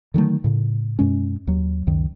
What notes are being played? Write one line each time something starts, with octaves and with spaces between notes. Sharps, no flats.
D3 D#3 F#3 A3
A2 C#3
F#2 B2 G#3 C#4
D#2 F#3
C#2 F#2 D#3